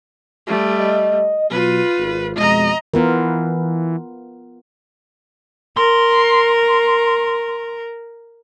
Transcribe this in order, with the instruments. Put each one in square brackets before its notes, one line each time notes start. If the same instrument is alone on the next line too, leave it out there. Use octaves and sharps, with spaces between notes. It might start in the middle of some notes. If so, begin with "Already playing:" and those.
[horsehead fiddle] G3 A3
[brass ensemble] D#5
[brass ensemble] B2 F#3 [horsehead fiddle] F4 B4
[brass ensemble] G#1
[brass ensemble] F2 B2 G#3 [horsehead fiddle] D#5 A#5
[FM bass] E3 [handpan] B3 F4 A#4
[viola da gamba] A#4 [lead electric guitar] C6